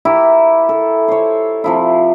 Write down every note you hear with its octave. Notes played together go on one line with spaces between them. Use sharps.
E4 G4 A#4
A4
C5 C#5
C3 F3 E4